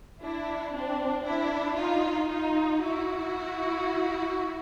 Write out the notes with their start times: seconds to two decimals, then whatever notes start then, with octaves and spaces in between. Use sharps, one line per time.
0.22 D4 E4
0.74 C4 D4
1.25 D4 E4
1.77 D#4 F4
2.29 D#4 F4
2.82 E4 F#4